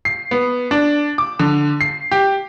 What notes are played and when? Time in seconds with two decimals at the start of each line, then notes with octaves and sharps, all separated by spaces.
0.05 C7
0.31 B3
0.71 D4
1.18 D6
1.39 D3
1.81 C7
2.11 G4